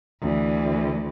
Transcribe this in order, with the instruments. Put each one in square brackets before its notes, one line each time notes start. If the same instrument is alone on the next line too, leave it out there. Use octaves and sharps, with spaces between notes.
[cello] D2 E3